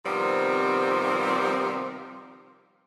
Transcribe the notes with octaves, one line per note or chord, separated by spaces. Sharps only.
C3 D#3 F3 G3 B3 C4